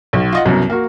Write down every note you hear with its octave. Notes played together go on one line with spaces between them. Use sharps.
B1
F4 D#5 F#5
C2 F#2 B2
A#3 F#4